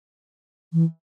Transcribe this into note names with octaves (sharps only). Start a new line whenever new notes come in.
E3